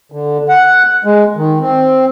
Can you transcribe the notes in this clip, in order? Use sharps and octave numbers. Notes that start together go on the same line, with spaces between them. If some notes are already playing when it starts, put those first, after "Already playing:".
D3
F#5
G#3
D#3
C4